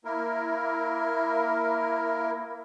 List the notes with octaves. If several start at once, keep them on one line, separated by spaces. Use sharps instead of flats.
A#3 E4 A#4